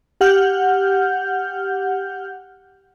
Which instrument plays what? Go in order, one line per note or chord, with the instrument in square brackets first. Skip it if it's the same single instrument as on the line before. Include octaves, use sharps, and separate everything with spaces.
[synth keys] G4 F#5 F6 G6